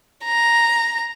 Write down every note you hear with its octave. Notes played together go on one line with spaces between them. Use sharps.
A#5